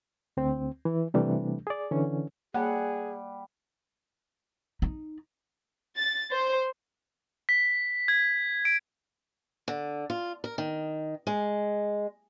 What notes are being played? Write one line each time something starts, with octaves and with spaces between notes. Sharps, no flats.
D2 C4
E3
C3 E3 G3 A3 D4
G#4 D5
D3 E3 C#4
G3 A#3 G#4 C#5 F#5 A5
D#4
A6
C5
B6
G#6
D7
D3
F4
A#4
D#3
G#3